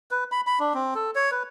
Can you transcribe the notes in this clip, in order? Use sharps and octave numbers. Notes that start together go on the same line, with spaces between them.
B4
B5
B5
D4
C4
A4
C#5
B4